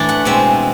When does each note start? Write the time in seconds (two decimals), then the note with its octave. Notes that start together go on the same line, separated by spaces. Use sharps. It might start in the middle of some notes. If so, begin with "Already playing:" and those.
Already playing: A2 E3 A3 D4
0.09 F#5
0.25 B2 G#3 C4 E5